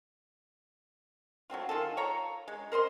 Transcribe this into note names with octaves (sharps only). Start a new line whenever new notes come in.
F#3 A3 C4 F4
D#3 F4 G#4 A4
F4 C#5 A#5
G#3
A#4 C5 D#5 C6